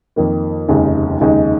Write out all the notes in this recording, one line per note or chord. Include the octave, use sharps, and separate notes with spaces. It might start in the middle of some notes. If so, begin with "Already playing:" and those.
F2 D#3 A#3
F1 D#2 C#3 G#3 D#4
F1 D#2 C#3 G#3 D#4